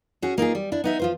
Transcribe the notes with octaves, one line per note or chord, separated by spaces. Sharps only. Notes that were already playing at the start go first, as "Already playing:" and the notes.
C#4 F#4 G#4
A#3 D#4 F4 G#4
G3
D4 E4
B3 D#4 E5
F3 F4 C5